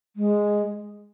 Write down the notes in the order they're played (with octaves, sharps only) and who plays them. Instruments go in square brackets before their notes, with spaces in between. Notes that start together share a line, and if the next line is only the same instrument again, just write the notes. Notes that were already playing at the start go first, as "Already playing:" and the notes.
[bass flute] G#3